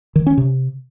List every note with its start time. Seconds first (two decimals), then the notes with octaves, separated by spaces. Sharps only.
0.16 D#3
0.27 C#4
0.37 C3